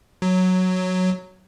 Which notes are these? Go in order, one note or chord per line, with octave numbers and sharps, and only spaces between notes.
F#3